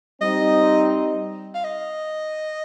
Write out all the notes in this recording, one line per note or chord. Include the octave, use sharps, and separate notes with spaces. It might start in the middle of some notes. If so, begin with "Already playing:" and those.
G3 C4 D#4 D#5
F5
D#5